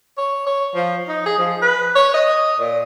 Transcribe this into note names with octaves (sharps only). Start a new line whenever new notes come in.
C#5
C#5
F3
D#4
G#4
F3
B4
C#5
D#5
A#2